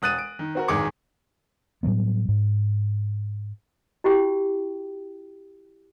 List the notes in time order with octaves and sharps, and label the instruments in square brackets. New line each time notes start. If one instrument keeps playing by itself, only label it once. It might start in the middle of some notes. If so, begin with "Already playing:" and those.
[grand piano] E1 D#6 F#6 A6 D#7
D7
D#3
C4 F#4 A#4
D1 G#1 D#3 G#4 D6 C#7
[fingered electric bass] A2 F#3 G3 B3
G#2
[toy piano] E4 F#4 G4 G5